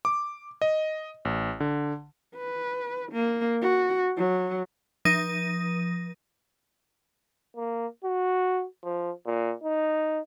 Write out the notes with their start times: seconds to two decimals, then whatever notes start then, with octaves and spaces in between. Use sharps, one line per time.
0.05 D6
0.62 D#5
1.25 A1
1.60 D3
2.35 B4
3.12 A#3
3.61 F#4
4.17 F#3
5.05 F3 D#6 A#6 D#7
7.57 A#3
8.04 F#4
8.83 F3
9.26 A#2
9.63 D#4